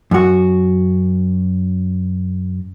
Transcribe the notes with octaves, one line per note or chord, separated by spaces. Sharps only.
F#2 F#4